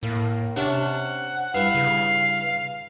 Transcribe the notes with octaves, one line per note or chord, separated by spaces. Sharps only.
A2 A#3
C3 C#4 D4 F#5
G2 E4 F5
C#3